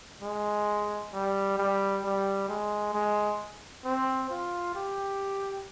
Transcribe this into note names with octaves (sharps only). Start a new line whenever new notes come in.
G#3
G3
G3
G3
G#3
G#3
C4
F4
G4